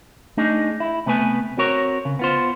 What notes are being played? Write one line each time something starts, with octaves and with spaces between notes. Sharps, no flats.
A3 D4 D#4 G#4
E4
C3 A3 B3 B4 G#5
C4 F#4 A#4 C#5
C#3
B3 F4 C5